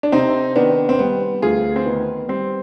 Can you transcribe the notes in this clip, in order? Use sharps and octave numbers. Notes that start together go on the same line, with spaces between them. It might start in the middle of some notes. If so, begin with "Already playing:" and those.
D4
C3 C4 D#4
D#3 B3 D4
C4
G3 B3
D2 F4 G#4
C4
D#3 B3
G3 C4